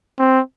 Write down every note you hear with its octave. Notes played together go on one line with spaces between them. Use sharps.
C4